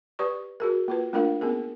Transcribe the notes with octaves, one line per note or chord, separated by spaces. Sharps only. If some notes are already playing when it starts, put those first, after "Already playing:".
G4 B4 D5 C#6
F#4 G#4 A#4
A#3 F4 B4
A3 A#3 D4 F4 A#4 F5
A#3 B3 C#4 G#4 A#4